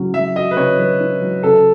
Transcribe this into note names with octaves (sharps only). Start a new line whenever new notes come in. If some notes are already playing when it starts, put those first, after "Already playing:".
Already playing: C#3 F#3 C#4 F#4
F#3 E5
F#4 D#5
B4
C#3 C#5
F#3 B4
C#4
F#3
C#3 A4